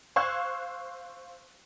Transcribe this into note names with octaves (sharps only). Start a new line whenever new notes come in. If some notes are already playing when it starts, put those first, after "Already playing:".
C5 F5 C#6 E6 F#6 G#6